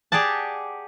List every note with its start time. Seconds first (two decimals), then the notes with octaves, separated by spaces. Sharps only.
0.12 G4 G#4 D5 F#5 A5